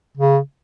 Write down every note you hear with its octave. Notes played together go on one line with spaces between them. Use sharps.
C#3